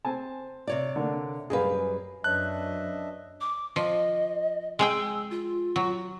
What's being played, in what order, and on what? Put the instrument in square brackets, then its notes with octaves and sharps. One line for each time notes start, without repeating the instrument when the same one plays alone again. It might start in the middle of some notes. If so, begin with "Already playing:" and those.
[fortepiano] C4 G#5 A5
[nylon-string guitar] C3 C#5 D5
[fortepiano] D3 A#3 D4
[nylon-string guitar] F#2 G3 B4 [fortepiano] G#4 F5
[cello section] F#2 [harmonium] D4 D#5 E5 [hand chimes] B4 C#5 A5 [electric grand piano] F#6
[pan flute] D6
[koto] F3 [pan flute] D#5
[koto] G#3 G#4 G5 [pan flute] E6
[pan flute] F4
[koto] F#3